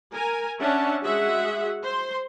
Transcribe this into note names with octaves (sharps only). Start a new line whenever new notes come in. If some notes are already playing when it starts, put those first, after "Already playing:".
A#4 G#5
C#4 D4 C#5 E5 F#5 A5
G#3 F#4 G#4 E5 F#5
C5 C6